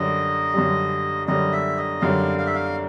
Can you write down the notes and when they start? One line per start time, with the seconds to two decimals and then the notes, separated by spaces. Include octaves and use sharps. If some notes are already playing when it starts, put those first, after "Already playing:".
Already playing: F#2 D3 G3 D#5
0.54 F#2 D3 G3
1.28 F#2 D3 G3 D#5
1.53 E5
1.77 D#5
2.01 F#2 D3 G3 F5
2.39 F5
2.47 E5
2.55 F5